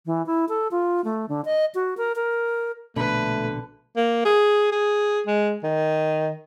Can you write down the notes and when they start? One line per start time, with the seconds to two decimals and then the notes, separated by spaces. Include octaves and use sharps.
0.06 E3
0.26 E4
0.49 A4
0.71 F4
1.04 A3
1.29 D3
1.45 D#5
1.75 F#4
1.97 A#4
2.16 A#4
2.96 A#1 B2 D3 A3 B4
3.97 A#3
4.25 G#4
4.72 G#4
5.26 G#3
5.63 D#3